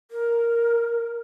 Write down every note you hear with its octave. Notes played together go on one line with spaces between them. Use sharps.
A#4